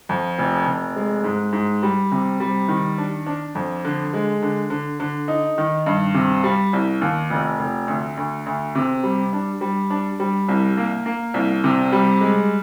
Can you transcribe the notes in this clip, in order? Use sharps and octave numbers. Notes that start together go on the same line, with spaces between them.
F2
F1
F1
G#3
G#2
G#2
G3
C3
G3
D#3
D4
D4
F2
D3
G#3
D3
D3
D3
D#4
D#3
G2
C3
G3
C2
D#2
F1
F1
D2
D2
D2
C3
G3
D4
G3
D4
G3
C2
A#3
A#3
C2
C3
G3
G#3